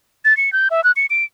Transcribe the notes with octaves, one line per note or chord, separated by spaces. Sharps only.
A6
C#7
G6
E5
F#6
C#7
D7